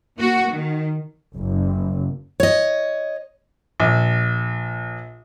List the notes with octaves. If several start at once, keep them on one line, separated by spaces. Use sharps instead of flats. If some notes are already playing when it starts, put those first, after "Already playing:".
A#3 F#4
D#3
F#1
C#5 D#5
A#1